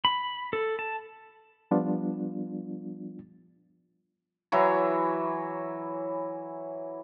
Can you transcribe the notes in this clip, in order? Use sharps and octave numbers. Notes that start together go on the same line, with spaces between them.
B5
A4
A5
F3 G3 B3 D4 F4
E3 F#3 E4 C#5